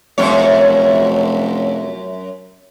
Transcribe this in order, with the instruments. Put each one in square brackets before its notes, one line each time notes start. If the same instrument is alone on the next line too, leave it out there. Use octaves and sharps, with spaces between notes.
[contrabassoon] F1 [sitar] F#2 C#5